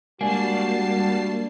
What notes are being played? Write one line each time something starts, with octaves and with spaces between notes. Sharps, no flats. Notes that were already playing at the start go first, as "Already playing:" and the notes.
G3 G#3 A#3 D4 F#4 A5 C7